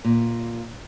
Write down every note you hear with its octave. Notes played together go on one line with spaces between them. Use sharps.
A#2